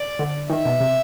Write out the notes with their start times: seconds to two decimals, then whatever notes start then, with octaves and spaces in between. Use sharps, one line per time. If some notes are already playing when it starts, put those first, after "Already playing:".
Already playing: D5
0.19 D3
0.50 D#3 E5
0.65 B2
0.80 C3